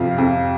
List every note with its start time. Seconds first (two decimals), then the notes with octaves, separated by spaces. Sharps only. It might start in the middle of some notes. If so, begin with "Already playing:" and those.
Already playing: F2 C3 F3 F5
0.18 F2